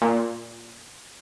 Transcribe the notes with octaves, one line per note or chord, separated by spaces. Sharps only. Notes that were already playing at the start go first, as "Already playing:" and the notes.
A#2